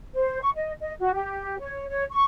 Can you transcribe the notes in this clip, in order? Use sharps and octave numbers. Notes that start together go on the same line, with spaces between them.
C5
C#6
D#5
D#5
F#4
G4
C#5
C#5
C#6